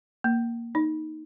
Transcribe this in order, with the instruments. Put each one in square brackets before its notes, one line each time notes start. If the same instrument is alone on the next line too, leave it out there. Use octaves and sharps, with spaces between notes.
[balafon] A#3
D#4